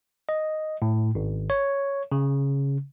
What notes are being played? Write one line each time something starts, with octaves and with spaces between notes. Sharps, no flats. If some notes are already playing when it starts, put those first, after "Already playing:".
D#5
A2
G#1
C#5
C#3